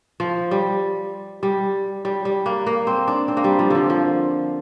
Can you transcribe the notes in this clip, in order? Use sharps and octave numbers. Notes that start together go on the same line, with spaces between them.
F3
G3
G3
G3
G3
A#3
A#3
C4
D4
C4
A#3
G3
F3
D3 F3
F3